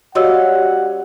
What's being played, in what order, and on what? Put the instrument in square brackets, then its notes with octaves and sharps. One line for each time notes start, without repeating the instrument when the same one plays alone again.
[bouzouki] G3 C#4 F5 [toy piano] F#4 D#5 E6 [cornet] F#5